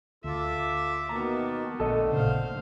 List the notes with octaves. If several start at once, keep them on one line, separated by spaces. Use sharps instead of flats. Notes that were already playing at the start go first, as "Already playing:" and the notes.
D2 F4 A4 E5 D6
B2 D#3 A#3 B3 A5 A#5
A#1 D3 A3 A4 D#5
A1 A#2 C#3 C5 F5